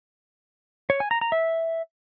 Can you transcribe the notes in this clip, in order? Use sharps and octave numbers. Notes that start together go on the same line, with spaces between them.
C#5
G#5
A#5
A#5
E5